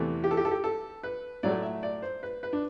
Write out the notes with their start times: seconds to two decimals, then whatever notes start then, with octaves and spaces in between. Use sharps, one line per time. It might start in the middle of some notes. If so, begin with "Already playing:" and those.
Already playing: E2 C3 E3 A3
0.24 G4
0.31 A4
0.37 G4
0.45 A4
0.51 G4
0.64 A4
1.03 B4
1.43 A2 F#3 A3 D5
1.62 E5
1.83 D5
2.02 C5
2.23 B4
2.43 B4
2.53 D4